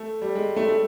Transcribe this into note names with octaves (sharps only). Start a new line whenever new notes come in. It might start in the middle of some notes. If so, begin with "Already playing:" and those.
Already playing: A3
G3
G#3
A3
A3